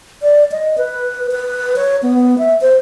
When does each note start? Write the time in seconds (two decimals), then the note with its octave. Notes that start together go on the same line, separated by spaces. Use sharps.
0.22 D5
0.52 D#5
0.78 B4
1.32 B4
1.76 C#5
2.03 B3
2.38 E5
2.61 C5